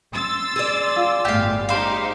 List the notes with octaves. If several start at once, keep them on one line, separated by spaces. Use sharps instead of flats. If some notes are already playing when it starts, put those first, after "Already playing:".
C6 E6 A6
G#4 D5
F4
G1 A2 G4 F5
D#4 G4 C5 F5